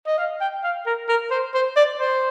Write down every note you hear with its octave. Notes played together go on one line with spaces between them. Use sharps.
D#5
F5
G5
F5
A#4
A#4
C5
C5
D5
C5